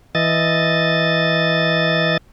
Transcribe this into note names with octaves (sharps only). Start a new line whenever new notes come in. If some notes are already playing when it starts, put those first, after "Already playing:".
E3 D#5 A6